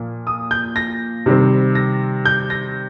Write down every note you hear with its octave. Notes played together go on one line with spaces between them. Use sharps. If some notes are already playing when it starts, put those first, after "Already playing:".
Already playing: A#2 F3 A#3
D#6
G6
A#6
C3 D#3 G3 C4
A#6
G6
A#6